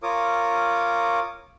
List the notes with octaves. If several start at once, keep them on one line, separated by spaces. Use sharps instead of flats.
F4 A#4 C#5 D6 D#6